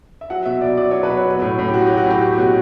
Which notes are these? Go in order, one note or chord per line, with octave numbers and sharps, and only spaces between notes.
E5
F#3 F#5
B2 E5
B2 D5
F#3 D5
F#3 C#5
B4
B2
C#5
F#3
A2
A2
G4
F#3 F#4
G4
F#3
F#4
A2 G4
F#3 G4
G4
B2 F#4